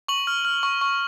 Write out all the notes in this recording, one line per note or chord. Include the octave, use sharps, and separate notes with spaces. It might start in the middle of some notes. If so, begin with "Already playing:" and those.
C#6 F#7
F6
F6
C#6
C#6